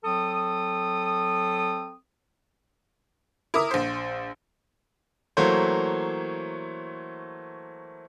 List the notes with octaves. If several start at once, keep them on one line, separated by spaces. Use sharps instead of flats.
F#3 C4 A4 D#6
E4 A#4 D6 D#6
A#1 C5
E3 F#3 A3 A#3 C5 C#5